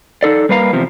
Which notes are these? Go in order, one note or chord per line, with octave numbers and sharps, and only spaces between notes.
D#4 A4 D5
G3 A#3 B4 F5 A#5
E2 C3 F3